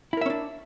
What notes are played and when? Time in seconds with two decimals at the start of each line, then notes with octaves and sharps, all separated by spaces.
0.13 E4
0.17 A#4
0.21 E5
0.26 C#4
0.30 D4